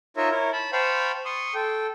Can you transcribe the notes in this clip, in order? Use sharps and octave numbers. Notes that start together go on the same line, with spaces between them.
D#4 F4 A#4 C#5 D#5 E5
E4 A#4 C#5
A5 B5
C5 F5 G5 A5 B5 C#6
C6 C#6 D#6
A4 G5